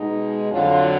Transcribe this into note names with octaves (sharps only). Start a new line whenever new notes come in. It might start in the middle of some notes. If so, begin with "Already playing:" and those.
Already playing: B2 G#3 D#4
F2 D3 F#3 F4